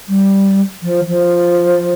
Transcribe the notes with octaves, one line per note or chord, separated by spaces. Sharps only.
G3
F3
F3